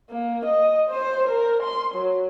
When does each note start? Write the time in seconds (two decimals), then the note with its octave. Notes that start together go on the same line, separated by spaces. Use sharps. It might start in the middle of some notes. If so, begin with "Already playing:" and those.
0.10 A#3
0.46 D#5
0.90 C5
1.29 A#4
1.63 C6
1.95 F#3